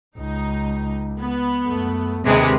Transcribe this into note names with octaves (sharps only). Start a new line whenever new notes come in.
C#2 D#4
B3
F#2 A3
D#2 C3 D#3 G#3 D4 G#4 B4